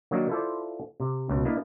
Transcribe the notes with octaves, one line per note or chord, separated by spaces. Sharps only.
D#3 F#3 A#3 D4 D#4
E4 F4 A4 C5 D5
C3
C#2 B2
A#3 D4 E4 D#5 F5